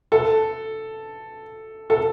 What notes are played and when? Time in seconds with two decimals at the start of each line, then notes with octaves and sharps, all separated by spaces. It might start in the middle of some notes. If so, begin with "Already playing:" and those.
0.12 A4
1.90 A4